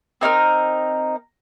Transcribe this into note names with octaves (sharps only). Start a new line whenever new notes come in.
C4 D#4 A#4 F6